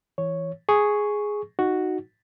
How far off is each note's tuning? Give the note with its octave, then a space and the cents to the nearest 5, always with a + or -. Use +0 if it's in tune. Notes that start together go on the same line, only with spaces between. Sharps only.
E3 +0 C#5 +0
G#4 +0 C#6 +0
D#4 +0 F#4 +0